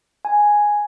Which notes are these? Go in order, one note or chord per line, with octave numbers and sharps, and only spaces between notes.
G#5